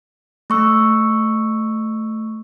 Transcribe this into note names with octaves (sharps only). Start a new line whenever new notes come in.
A3 C#6 E6